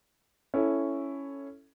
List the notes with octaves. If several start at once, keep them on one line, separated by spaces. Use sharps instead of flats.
C#4 E4 A4